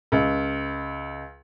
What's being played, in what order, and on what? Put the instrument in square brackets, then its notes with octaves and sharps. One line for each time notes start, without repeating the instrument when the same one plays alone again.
[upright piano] C#2